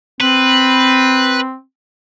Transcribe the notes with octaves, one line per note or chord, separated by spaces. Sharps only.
C4 B4